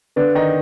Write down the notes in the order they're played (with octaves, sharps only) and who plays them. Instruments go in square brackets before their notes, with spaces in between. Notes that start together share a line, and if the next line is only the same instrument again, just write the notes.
[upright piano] D3 D4 [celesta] B4
[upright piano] D#3 D#4 [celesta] D5